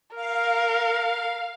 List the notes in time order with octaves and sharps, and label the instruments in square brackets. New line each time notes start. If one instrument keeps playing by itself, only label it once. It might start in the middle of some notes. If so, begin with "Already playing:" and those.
[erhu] A#4 [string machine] F5